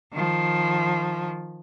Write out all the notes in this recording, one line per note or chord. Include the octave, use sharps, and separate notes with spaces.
D#3 F3